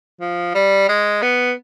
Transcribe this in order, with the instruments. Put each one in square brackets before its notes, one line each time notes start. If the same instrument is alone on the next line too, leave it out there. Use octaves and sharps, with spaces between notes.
[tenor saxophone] F3
G3
G#3
B3